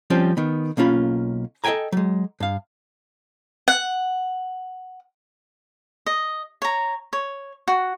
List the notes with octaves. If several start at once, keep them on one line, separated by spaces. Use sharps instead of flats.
F3 G3 C4 C#4 C5
D#3 B3
B1 A#3 C#4 F4 B5
A4 D#5 E5 G5 G#5 A#5
F#3 G#3
G2 F5
F#5
D#5
C#5 A#5
C#5
F#4